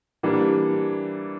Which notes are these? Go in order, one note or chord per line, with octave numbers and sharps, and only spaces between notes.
E3 G3 A#3 D4